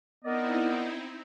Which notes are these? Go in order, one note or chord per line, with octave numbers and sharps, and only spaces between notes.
B3 C4 D#4 E4 A#4 D5 D#5